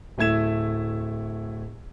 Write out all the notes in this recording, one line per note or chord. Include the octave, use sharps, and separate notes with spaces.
D1 A3 E4 G#6 E7